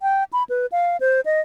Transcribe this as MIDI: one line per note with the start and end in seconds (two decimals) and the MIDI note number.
0.02 0.24 79
0.33 0.43 83
0.49 0.66 71
0.72 0.97 77
1.00 1.21 72
1.26 1.41 75